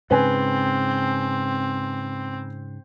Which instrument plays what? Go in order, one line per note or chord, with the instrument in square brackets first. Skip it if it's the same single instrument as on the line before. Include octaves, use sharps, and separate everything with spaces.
[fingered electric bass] G#2 C#3 [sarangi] C4 [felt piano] B4 G#5